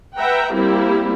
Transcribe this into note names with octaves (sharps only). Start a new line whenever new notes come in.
B4 E5 F#5 G5 A#5
G3 A#3 C4 E4 G4